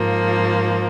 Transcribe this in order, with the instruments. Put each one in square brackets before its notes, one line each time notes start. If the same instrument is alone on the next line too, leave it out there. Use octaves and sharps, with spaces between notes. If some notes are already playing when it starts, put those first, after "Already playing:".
Already playing: [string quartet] G#2 F3 A#3